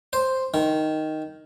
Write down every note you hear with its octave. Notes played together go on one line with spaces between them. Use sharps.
C5
D#3